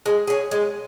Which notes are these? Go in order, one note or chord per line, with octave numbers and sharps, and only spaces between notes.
G#3
C#4 G#4
G#3